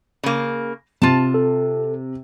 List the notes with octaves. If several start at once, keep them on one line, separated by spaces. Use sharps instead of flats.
C#3 A#3
C3 F4 A5
A4